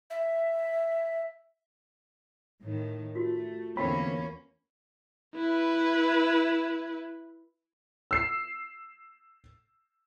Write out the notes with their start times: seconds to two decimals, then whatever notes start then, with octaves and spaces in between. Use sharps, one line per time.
0.10 E5
2.63 A2 D#3
3.15 A3 F4 F#4 A#4
3.77 E2 D3 A3 A#3 C4 C#4 B5
5.36 E4 B4
8.11 E6 C7